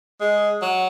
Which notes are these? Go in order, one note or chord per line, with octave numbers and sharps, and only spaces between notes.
G#3
F#3